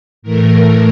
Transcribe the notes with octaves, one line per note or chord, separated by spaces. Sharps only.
A2 E3 A3 A#4